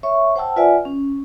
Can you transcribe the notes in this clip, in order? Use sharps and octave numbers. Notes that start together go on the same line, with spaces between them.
C#5 E5 C#6
C5 F#5 G5 A5 E6
F4 B4 D5 E5 F#5 G#5
C#4